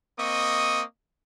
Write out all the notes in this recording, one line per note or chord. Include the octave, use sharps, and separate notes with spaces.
A#3 C4 D#5 C#6 D#6